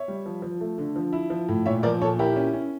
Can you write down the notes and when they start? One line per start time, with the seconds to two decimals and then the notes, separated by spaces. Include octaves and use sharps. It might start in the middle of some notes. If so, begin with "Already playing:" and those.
Already playing: C#5 E5
0.08 G3
0.26 F3
0.42 F3
0.61 A3
0.78 D3
0.96 F3
1.13 E4
1.30 F3
1.49 A2
1.66 A#2 C#5 E5
1.83 F3 A#4 D5
2.01 A#2 A4 C#5
2.19 E4 G4 A#4
2.36 C#4
2.54 C#4